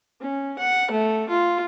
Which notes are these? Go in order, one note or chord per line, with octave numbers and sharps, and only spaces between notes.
C#4
F#5
A3
F4